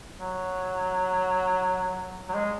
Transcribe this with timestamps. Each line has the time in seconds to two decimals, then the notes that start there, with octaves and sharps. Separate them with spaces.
0.18 F#3
2.29 F#3
2.34 G#3